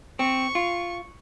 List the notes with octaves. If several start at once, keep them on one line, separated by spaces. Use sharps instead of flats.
C4 C#6
F4